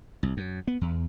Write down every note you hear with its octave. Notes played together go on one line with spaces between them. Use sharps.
C2
F#2
B3
E2